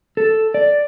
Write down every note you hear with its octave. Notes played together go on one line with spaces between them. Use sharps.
A4
D5